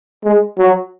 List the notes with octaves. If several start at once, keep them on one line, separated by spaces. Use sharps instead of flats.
G#3
F#3